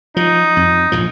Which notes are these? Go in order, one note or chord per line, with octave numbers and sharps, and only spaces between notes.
F3 D#4
F2
A#1 G#2 F3